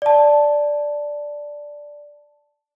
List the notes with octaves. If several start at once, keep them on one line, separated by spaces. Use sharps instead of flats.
D5 A5